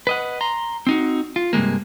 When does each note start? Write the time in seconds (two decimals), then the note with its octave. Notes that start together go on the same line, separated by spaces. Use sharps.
0.07 B4 D#5 F#5
0.41 A#5 C6
0.87 C4 D#4 F#4
1.36 F4
1.53 G2 C3 E3 G#3 A#3